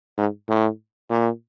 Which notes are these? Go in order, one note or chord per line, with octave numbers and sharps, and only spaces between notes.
G#2
A2
A#2